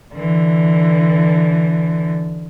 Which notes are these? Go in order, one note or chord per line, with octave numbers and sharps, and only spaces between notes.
D3 E3